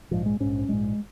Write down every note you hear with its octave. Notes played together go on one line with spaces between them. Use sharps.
A#1 G#2 F3
G#3
A#1 G#2 C#4
A#1 G#2 G#3